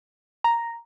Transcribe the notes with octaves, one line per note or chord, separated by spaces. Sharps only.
A#5